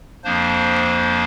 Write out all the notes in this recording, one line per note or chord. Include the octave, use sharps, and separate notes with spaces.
F2 F3 A#3 D4 C5